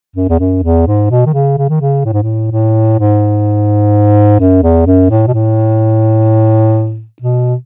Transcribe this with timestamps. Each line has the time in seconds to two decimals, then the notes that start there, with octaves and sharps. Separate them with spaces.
0.16 F#2
0.29 E2
0.39 F#2
0.63 E2
0.87 G#2
1.11 B2
1.26 D#3
1.34 C#3
1.58 C#3
1.70 D#3
1.81 C#3
2.05 A2
2.13 G#2
2.22 A2
2.51 A2
2.99 G#2
4.40 F#2
4.63 E2
4.86 F#2
5.10 A2
5.27 B2
5.34 A2
7.22 B2